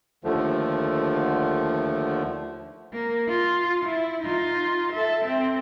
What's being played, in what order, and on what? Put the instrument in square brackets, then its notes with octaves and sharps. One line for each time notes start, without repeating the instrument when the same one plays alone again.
[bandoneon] D#2 D3 F3 A3
[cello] A#3
F4
E4
D#4 F4
A4 E5
C4